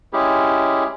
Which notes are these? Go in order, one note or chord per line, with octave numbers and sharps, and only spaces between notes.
G#3 C#4 E4 G4 G#4